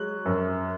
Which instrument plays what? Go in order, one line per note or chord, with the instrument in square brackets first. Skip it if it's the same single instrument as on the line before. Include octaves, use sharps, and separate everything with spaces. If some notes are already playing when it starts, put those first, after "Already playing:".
Already playing: [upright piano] F#3 G#3 F#6
F#2